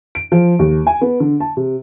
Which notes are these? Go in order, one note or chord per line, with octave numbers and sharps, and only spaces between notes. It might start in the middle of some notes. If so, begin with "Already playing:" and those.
D7
F3
D#2
G#5
B3
D3
A5
C3